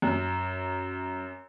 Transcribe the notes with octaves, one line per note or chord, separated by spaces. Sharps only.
F#2